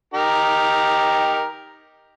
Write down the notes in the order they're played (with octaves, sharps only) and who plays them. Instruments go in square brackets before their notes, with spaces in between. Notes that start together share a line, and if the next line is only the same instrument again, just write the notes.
[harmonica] D#4 G4 A#4